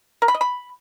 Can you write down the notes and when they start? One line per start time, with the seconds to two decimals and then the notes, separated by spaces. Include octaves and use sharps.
0.22 A#4
0.28 B5
0.34 D#5
0.41 B5